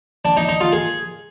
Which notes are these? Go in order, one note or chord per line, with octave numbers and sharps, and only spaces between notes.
D4
D#4
D#4
F4
G#4